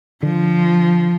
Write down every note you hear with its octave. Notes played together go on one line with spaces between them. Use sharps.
D3 F3